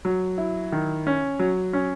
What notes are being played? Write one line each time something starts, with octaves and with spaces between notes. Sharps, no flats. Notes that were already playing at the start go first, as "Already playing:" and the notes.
F#3
E4
D#3
C#4
F#3
C#4